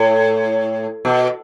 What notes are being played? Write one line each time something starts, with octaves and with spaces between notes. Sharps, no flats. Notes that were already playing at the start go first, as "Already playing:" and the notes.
Already playing: A2
B2